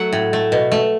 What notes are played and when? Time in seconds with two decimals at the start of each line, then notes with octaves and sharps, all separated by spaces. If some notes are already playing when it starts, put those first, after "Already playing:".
Already playing: F#3 A3 E5 F#5
0.13 A2
0.33 A3
0.52 B2
0.72 A3